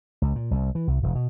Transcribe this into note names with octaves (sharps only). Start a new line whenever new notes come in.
C#2
A#2
C2
E3
C2
E1
B2